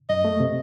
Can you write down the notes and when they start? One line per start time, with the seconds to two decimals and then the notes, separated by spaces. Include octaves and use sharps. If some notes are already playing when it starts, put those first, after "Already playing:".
0.09 F#2 D#5
0.25 A3
0.40 C3